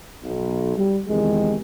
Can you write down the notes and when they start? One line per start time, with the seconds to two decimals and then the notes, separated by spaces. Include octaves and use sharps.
0.23 B1
0.75 G3 G4
1.08 E2 C3 D#3 G#3